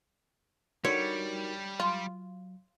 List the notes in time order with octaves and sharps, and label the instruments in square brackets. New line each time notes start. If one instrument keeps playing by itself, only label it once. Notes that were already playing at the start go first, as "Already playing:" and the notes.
[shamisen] D3 [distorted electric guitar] G3 [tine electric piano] D#4 F#4 A#4 [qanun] C#5
[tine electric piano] F#3 [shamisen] F4